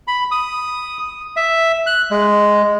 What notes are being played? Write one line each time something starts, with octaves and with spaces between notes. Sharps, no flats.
B5
D#6
E5
F#6
G#3